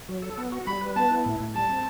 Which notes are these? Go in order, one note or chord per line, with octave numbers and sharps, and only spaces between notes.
F#3
A4
B3
F#4
G3 B5
B4
B3 A5
E4
A2
A2
G3 A5
C4